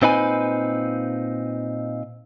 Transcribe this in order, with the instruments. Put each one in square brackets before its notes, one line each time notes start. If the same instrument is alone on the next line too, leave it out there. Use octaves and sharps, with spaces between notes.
[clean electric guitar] A#2 C4 D#4 B4 G#5